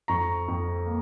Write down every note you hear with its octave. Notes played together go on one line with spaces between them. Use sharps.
F2 A#5 C#6
F2
A#3